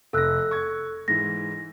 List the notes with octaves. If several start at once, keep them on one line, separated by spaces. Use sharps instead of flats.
F1 A4 E6 F#6 A#6
C#6 G#6
G#2 E3 A#6